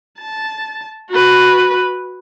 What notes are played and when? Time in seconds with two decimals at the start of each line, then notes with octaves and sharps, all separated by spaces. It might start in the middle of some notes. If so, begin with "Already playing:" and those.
0.19 A5
1.10 F#4 B4